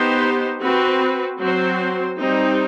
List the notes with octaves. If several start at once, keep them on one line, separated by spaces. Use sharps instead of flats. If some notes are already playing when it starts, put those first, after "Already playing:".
Already playing: B3 D#4 G4 C5
C4 F#4 B4
F#3 C4 F#4 C5
G3 C4 D#4